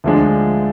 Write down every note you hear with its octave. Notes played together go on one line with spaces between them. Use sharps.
D2 D3 F3 G#3 D4